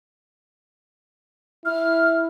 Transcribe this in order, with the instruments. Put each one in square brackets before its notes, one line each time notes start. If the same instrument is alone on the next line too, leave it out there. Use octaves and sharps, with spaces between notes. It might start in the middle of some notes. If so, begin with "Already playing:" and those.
[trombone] E4 [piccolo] F6